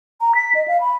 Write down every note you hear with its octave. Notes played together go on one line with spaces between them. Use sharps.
A#5
B6
D#5
F5
B5